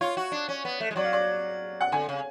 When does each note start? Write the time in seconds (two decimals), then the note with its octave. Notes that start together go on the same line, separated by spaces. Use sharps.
0.01 F4 C#5
0.17 F#4
0.32 D4
0.49 C#4
0.65 B3
0.80 A3
0.91 G#3
0.96 F#3 D5
1.04 F5
1.13 D5
1.81 F#5
1.92 D3 G#5
2.09 C#3